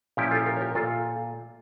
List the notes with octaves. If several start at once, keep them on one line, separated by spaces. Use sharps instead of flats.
A#2 F3 C#4 E4 G4
F4 A4
G4 A#4
C#5
G4 A#4
A#2 F4 A4